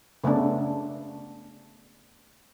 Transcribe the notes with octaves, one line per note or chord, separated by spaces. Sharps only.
C#3 A3 B3 D4